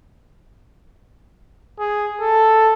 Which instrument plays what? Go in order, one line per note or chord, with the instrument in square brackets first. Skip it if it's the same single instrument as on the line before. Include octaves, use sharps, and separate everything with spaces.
[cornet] G#4
A4